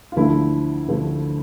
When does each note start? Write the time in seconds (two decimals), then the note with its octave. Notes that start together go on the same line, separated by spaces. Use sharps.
0.12 F4
0.16 D2 D3 F3 A3 E4
0.89 D2 D3 F3 A3